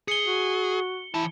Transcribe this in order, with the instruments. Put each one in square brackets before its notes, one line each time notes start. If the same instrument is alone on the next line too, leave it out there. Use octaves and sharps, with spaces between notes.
[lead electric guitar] G#4 [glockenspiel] C#7 G7
[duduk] F#4
[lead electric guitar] E3 A5 [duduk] E4